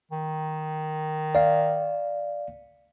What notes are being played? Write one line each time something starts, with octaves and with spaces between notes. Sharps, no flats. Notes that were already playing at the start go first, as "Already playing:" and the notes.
D#3
D5 F5